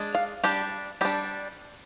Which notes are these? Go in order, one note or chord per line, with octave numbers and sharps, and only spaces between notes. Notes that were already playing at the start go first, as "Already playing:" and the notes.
Already playing: G#3 D4
F5
G3 D4 G4
G3 D4 G4